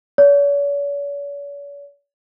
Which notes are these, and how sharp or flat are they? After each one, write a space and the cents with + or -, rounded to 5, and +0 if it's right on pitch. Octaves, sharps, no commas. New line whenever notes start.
C#5 +45